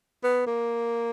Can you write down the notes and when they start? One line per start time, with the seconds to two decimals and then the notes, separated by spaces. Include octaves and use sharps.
0.23 B3
0.47 A#3